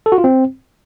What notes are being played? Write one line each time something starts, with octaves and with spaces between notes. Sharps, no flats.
A4
F#4
F4
C4